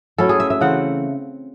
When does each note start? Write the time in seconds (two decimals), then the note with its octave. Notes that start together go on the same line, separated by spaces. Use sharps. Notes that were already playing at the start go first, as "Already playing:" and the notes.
0.18 F#3 A3 C#4 E4 A4
0.29 G#4
0.40 E5
0.50 E5
0.61 C#3 E3 A3 C4 F#5